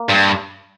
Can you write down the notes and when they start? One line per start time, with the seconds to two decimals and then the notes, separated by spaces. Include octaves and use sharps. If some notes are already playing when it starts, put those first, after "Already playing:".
Already playing: A#3
0.10 G2